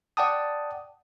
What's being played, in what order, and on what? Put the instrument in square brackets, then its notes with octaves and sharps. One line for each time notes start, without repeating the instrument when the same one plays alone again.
[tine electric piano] D5 F#5 G5 A5 D#6